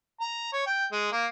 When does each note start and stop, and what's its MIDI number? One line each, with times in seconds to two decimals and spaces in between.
0.20 0.53 82
0.53 0.65 73
0.66 0.87 79
0.92 1.09 56
1.12 1.26 58